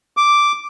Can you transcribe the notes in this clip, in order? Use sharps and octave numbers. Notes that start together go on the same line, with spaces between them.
D6